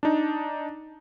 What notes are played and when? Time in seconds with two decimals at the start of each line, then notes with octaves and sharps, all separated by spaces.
0.03 D4 D#4